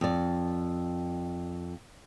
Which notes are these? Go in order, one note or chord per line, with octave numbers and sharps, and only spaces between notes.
F2 D5